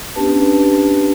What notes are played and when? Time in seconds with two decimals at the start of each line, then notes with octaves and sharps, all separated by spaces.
0.16 B3 C#4 D4 G4 B4 A5